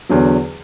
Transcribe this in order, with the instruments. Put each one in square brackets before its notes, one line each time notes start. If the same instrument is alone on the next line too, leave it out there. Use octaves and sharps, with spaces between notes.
[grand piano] E2 D3 F#3